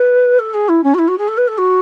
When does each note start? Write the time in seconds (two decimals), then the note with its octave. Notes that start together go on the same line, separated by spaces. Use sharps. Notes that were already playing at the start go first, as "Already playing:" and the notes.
Already playing: B4
0.39 A4
0.54 G#4
0.68 E4
0.83 C#4
0.94 F#4
0.98 E4
1.08 F#4
1.18 G#4
1.28 A4
1.37 B4
1.47 A4
1.57 F#4